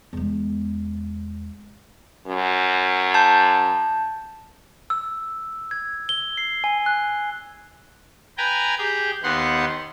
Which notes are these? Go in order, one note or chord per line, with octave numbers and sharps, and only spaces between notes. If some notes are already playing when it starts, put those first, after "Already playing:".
E2 G#3
F#2
A5 G6
E6
G#6
G7
C7
G#5
F#6
B4 G5 G#5 A#5
G4 G#4 G5
D#2 B3 D#4 F#5 C6